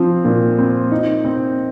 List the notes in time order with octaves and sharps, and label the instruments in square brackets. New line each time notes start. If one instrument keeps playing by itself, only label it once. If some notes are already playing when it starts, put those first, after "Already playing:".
Already playing: [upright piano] F3 C4
A#2
C4
D#4
C4